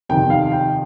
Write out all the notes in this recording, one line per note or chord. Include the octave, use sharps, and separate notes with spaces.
F2 C3 D#3 G5
F5
G5